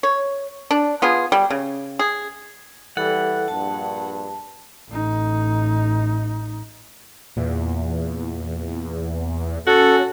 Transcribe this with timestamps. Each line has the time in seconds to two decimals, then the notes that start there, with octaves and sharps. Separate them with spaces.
0.03 C#5
0.71 D4
1.02 B3 F4 G#4
1.32 G3
1.50 C#3
1.99 G#4
2.97 E3 G3 A4 F#5
3.48 A#1 G2 A5
4.88 A1 D#4
7.37 E2 A#2
9.67 C#4 F#4 A4